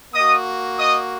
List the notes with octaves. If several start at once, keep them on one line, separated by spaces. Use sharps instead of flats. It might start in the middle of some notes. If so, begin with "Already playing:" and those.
A#3 F#4 D#5 D#6
D#5 D#6